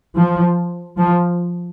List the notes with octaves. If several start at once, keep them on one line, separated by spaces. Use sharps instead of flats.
F3
F3